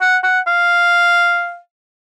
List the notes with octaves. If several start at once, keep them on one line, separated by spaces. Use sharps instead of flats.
F#5
F#5
F5